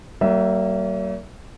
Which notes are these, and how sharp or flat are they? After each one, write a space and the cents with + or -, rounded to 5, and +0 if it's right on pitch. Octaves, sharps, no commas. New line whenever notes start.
F#3 +45 A#3 -20 E5 +0